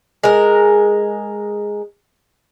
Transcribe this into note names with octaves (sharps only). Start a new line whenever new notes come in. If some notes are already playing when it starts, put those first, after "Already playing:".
G#3 A#4